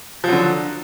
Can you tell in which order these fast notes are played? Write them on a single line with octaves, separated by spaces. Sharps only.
F3 F#3 D3